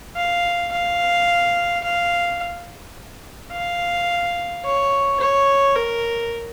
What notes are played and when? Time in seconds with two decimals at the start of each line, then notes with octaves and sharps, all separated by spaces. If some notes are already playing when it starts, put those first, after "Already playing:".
0.16 F5
0.72 F5
1.84 F5
3.52 F5
4.64 C#5
5.20 C#5
5.75 A#4